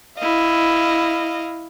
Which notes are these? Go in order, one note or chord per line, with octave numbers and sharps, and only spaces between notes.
E4 D#5 F5